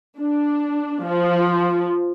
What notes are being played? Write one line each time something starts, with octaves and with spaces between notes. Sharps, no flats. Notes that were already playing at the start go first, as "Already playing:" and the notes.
D4
F3